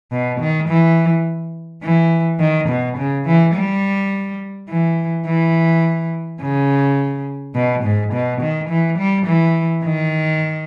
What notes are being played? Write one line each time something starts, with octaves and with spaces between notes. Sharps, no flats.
B2
D#3
E3
E3
D#3
B2
C#3
E3
G3
E3
E3
C#3
B2
G#2
B2
D#3
E3
G3
E3
D#3